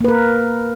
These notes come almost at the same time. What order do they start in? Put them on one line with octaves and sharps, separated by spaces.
A#3 B4 A#4